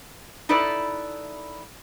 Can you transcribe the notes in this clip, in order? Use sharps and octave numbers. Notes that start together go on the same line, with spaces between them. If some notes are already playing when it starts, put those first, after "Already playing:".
D#4 E4 A4 B4 D5